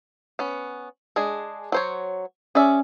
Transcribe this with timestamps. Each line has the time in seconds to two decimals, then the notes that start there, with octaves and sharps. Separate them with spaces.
0.39 B3 C#4
1.16 G#3 D4 G#4
1.72 F#3 C5 C#5
2.55 C#4 G#4 D5 E5